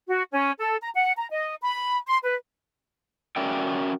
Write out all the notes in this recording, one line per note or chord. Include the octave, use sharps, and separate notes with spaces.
F#4
C#4
A4
A#5
F#5
A#5
D#5
B5
C6
B4
C#4 F#4 A#4 D5 E5 G5